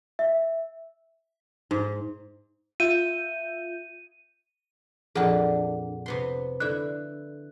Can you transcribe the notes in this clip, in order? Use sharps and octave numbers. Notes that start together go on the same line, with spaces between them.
E5
G#2
F4 E5 G6 D#7
F2 A#2 D4 G#4 F#5
C3 B3 C6
D3 E4 F#6